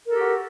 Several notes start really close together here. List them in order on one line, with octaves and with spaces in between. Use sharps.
A#4 A4 G4 F#4